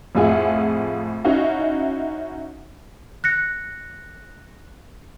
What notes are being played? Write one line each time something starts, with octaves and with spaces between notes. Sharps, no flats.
F2 A2 F4 G#4 E5 F#5
C#4 D#4 E4 F#4 F5
F#6 A#6 C#7